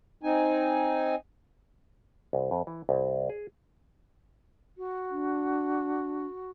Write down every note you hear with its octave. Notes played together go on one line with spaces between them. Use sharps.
C4 D#4 G#5
C2
F2
E3
C2
G#4
F#4
D4